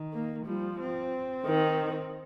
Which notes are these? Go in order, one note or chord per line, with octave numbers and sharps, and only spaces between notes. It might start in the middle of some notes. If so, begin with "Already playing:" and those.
Already playing: D#3
A#3
F3 G3
C4
D#3